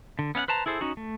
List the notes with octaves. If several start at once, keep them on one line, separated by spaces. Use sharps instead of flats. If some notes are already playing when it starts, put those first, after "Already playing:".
D3
B3 C#4 F5 F#5
B4 C5 A5 A#5
E4 G#4 A4 C5
C#4 D#4 F#4
A3